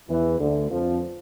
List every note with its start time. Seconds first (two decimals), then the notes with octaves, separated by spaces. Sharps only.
0.09 E2 E3
0.40 D2 D3
0.71 F2 F3